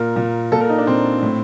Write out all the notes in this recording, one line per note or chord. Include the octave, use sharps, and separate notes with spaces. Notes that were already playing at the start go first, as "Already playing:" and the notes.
Already playing: A#2 A#4
A#2
A#2 A4
A#4
D#4
D4
A#2 C4
A2